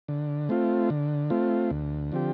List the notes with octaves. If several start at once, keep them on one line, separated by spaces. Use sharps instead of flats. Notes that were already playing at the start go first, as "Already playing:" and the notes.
D3
A3 C4 F4
D3
A3 C4 F4
D2
D3 F3 C4 G4